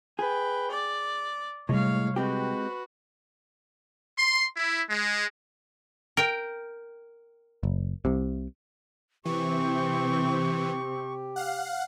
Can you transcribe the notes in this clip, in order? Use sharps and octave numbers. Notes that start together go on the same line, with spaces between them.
G#4 B4 G5
D5
A2 C3 G3 G#3 C#5 F5
G#3 C4 F#4 G4 B4
C6
E4
G#3
A#4 G5
F#1
C2 C3
C3 E3 C4 G4 C#6
F5 F#5